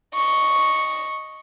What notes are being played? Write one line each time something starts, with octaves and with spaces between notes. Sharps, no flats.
D#5 C#6